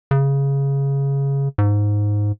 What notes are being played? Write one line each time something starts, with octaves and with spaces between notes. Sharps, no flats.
C#3
G#2